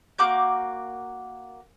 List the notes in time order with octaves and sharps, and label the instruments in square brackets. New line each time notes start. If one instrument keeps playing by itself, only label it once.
[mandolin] A#3 F#4 D6 G6